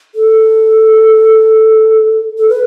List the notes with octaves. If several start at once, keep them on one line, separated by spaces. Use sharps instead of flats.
A4
A4
B4